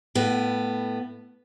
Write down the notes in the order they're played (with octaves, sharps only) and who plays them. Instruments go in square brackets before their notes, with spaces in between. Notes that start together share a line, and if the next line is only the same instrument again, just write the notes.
[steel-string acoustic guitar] A2 B3